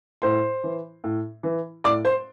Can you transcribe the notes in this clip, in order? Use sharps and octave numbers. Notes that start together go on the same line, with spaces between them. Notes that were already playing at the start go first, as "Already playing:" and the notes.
A2 C5 C6
E3
A2
E3
A2 D5 D6
C5 C6